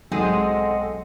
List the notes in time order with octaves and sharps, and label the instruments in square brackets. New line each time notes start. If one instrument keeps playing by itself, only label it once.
[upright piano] B1 G#2 [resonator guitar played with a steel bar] G#3 C4 G#4 [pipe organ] A4 D#5 F#5